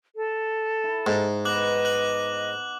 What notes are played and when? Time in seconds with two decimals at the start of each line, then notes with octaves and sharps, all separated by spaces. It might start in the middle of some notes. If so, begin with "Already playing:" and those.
0.16 A4
0.84 E4
1.07 G#2 D#4
1.45 B3 D#5 D6 F#6 F#7
1.85 F#6 F#7